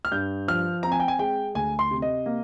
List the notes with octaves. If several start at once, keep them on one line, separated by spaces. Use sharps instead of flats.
F6
G2 G6
F3 F6
C4 A#5
G#5
G5
G#5
G#3 G5
D2 G#5
C6
C3
D#5
A#3